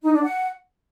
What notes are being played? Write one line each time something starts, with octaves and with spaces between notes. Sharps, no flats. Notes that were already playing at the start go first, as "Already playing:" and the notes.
D#4
D4
F#5